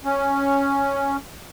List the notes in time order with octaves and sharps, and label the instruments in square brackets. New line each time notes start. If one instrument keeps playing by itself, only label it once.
[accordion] C#4